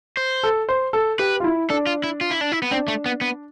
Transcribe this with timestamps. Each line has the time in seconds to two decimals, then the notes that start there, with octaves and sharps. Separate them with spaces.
0.17 C5
0.43 A4
0.69 C5
0.93 A4
1.19 G4 B4
1.40 F4
1.44 E4
1.70 D4 A4
1.87 F4
2.04 E4
2.21 F4
2.31 E4
2.41 D4
2.52 E4
2.62 B3
2.71 C4 D4
2.88 A3
3.06 B3
3.21 B3